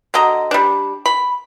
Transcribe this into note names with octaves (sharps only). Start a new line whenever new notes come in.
D3 F#4 D#5 A#5
G3 D4
B5